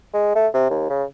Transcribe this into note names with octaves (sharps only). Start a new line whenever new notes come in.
G#3
A3
C3
D#2
C#3